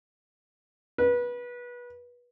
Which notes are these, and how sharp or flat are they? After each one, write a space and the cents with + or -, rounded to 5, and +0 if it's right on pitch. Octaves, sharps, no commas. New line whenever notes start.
B4 -25